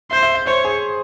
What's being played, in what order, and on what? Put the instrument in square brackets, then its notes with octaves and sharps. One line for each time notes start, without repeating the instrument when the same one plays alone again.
[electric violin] C5 [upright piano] E5
[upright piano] E5
E5
[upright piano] C5 [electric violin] C#5
[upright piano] G#4